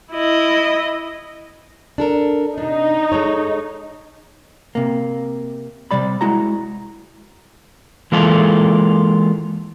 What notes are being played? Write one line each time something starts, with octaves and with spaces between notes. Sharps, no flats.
E4 D#5
D4 A4 A#4
C3 D4 D#4
G#3 A4 C#5
C3 A#3
C3 G3 D5 B5
G#3 E4 F#4 A#5
E3 G#3 A#3 F4 A4